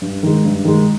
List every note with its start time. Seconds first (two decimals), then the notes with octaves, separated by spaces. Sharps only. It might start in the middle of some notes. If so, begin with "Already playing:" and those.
0.02 G2
0.23 D#3 G#3
0.45 G2
0.65 D#3 G#3